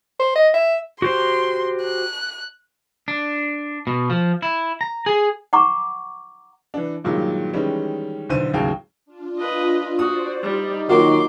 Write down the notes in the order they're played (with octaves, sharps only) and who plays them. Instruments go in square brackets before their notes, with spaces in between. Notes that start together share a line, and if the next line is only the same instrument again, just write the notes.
[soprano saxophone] C5
D#5
E5
[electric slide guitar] F#4 G4 C5 [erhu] C6
[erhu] F#6
[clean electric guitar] D4
B2
F3
E4
A#5
G#4
[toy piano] F#5 A#5 C#6 D6
[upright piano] E3 D4
G2 A#2 D#3 F#3 G#3
D#3 E3 G3 G#3 C#4
B1 D3 E3 C5 D#7
A1 D#2 C#3 F#3 F5 G5
[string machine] D4 F4
[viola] B4 D#5
[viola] F#4 [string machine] C5 D5 [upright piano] D#6
[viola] G3 [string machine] D#4
[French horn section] D#3 F#4 [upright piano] F#3 A#3 F4 [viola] C6 D6